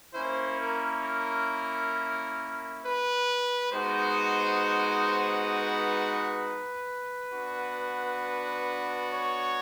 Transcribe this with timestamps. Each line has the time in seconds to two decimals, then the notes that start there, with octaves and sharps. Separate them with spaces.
0.12 A#3 C#4 E4 C5
0.57 A#4
1.02 A#4
2.83 B4
3.72 G#3 B3 D#4 F#4 C5
5.52 B4
7.32 B3 D4 F#4
9.12 C#5